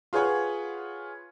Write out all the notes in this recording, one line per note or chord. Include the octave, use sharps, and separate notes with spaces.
F4 G#4 B4 C#5 F#5